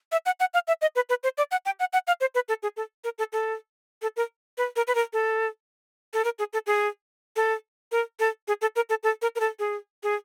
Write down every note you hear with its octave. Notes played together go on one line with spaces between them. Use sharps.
E5
F#5
F#5
F5
E5
D#5
B4
B4
C5
D5
F#5
G5
F#5
F#5
F5
C5
B4
A4
G#4
A4
A#4
A4
A4
A4
A#4
B4
A#4
B4
A#4
A4
A4
A#4
G#4
A4
G#4
A4
A#4
A4
G#4
A4
A#4
A4
A4
A#4
A#4
A4
G#4
G#4